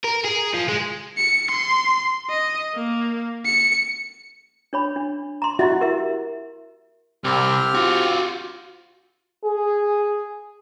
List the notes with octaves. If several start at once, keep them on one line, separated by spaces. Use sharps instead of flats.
A#4
G#4
F3
G#3
C#7
C6
D#5
A#3
C#7
D4 C#5 B5
D4
A#5 C6
E4 F#4 D#5 E5
G4 A#4 E5
C2 C4 G4 F6
F4 F#4
G#4